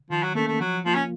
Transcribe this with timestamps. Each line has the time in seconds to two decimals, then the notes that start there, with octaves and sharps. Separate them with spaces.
0.10 D#3 F3
0.23 F#3
0.35 A3 A#3
0.39 C#4
0.47 A3
0.60 F3 F#3
0.85 F3 A#3 F4
0.95 C#4